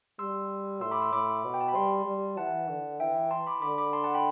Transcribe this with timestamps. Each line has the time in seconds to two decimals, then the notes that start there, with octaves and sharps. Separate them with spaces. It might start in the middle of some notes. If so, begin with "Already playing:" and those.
0.19 G3 C6 E6
0.81 A2 C6 E6
0.91 B5 D6
1.02 C6 E6
1.13 A2 B5 D6
1.44 B2
1.54 G5
1.61 A5
1.68 B5
1.75 G3 A5 C6
2.06 G3
2.37 E3 F#5 A5
2.68 D3
3.00 E3 E5 G5
3.31 A5 C6
3.47 B5 D6
3.62 D3 B5 D6
3.78 B5 D6
3.93 A5 C6
4.04 F#5 A5
4.14 G5 B5